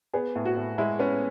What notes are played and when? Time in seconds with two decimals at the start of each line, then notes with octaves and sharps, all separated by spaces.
0.14 B3 G#4
0.36 A2
0.45 F#4
0.57 A2
0.78 G#3 E4
0.99 B3 C#4